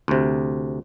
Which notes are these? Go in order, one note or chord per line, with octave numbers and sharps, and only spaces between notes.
D2 C3